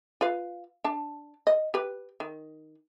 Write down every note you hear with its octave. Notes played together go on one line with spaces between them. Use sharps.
F4 B4 F5
D4 A5
D#5
G4 B4
D#3